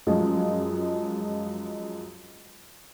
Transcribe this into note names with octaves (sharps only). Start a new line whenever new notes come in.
F#2 F3 G#3 F4